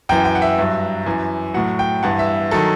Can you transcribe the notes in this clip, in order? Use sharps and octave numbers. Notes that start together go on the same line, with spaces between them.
F#2 E3 G5
G5
F#5
E5
G2 F#3
F#2 E3
A2 F#3 F#5
G5
G2 E3 F#5
E5
D#3 F#3 A4